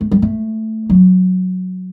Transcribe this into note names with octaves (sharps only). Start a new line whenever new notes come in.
A3
G3
A3
F#3